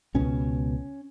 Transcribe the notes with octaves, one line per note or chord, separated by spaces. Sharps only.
C#2 B2 C#4